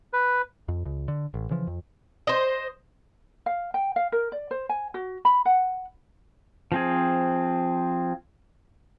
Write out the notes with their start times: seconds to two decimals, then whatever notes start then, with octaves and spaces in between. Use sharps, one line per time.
0.13 B4
0.68 F2
0.85 C#2
1.08 D3
1.34 A1
1.51 C#3 E3 F3
1.67 F2
2.27 C5 D#5
3.46 F5
3.74 G5
3.96 F5
4.12 A#4
4.32 D5
4.51 C5
4.69 G#5
4.94 F#4
5.25 B5
5.45 F#5
6.72 F3 C4 G#4